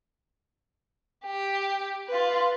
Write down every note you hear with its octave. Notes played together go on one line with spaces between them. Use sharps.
G4
F4 B4